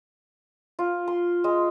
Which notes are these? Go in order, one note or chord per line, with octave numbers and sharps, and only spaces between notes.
F4
C6
G#3